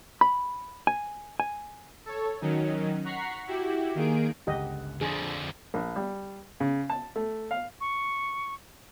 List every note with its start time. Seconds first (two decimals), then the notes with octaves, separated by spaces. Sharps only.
0.21 B5
0.87 G#5
1.40 G#5
2.06 A4 C#5
2.41 D#3 F#3 C#4 D#4
3.04 F#5 A#5 C#6 B6 C7
3.47 E4 F#4 G4
3.95 D#3 A#3 G#4 D7
4.47 G1 C#2 G4 D#5 F#5
5.01 F2 D3 D4 G#4
5.74 A#1
5.96 G3
6.60 C#3
6.90 A5
7.16 A3
7.51 F5
7.81 C#6